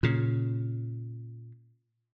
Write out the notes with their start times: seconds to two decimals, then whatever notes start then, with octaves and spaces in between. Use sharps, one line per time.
0.03 A#2 C#3